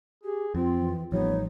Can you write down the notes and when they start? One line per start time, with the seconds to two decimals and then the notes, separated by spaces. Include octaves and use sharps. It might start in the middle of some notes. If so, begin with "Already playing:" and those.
0.24 G4 G#4
0.55 F2 C4 F4
0.79 E3
1.12 A1 F3 G3 B3 D#4 C#5